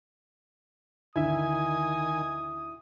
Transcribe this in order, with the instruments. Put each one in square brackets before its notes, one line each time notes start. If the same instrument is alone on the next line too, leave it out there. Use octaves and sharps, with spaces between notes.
[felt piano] D2 D3 [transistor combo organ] D#3 G#5 [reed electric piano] E4 E5 [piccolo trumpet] D#6